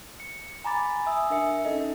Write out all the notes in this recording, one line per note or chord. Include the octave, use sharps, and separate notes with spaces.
C#7
G#5 A#5 B5 D6 A6
E5 G#5 D#6 E6
D4 A#4 E5 C#7
C#4 D#4 A4 D#5